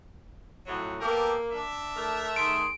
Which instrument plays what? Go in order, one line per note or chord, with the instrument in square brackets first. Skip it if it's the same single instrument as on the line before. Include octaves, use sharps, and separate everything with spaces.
[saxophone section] F2 A2 F#3
[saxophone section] A#3 [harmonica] B3 G4 A4 [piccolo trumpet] A#4
[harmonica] D4 [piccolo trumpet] E5
[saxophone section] A3 A#4
[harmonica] D#3 G#4 C6 [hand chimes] D7